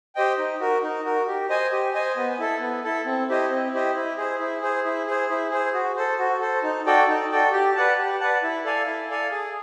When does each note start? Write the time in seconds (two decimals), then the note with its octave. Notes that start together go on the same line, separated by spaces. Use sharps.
0.15 G4 C5 D#5 G5
0.38 D#4
0.60 F#4 A#4
0.83 D#4
1.04 F#4 A#4
1.28 G4
1.49 C5 D#5 G#5
1.72 G4
1.94 C5 D#5 G#5
2.16 B3
2.39 E4 A4
2.61 B3
2.84 E4 A4
3.05 C4
3.29 E4 G4 C5 D#5
3.50 C4
3.73 E4 G4 C5 D#5
3.96 E4
4.18 G#4 C5
4.40 E4
4.62 G#4 C5
4.85 E4
5.07 G#4 C5
5.29 E4
5.51 G#4 C5
5.74 F#4
5.96 A4 C5
6.19 F#4
6.41 A4 C5
6.63 D#4
6.86 F#4 A4 D5 G5
7.08 D#4
7.31 F#4 A4 D5 G5
7.52 G4
7.75 B4 D5 F#5 A5
7.98 G4
8.20 B4 D5 F#5 A5
8.43 E4
8.65 A4 D5 F5 G#5
8.87 E4
9.10 A4 D5 F5 G#5
9.31 G#4